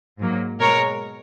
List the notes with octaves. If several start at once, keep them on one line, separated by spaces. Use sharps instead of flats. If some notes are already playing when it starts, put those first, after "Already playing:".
G#2 F#3 A#3
B2 G#3 A#4 C#5